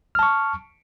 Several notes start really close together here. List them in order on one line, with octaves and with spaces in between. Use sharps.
F6 A5 C#6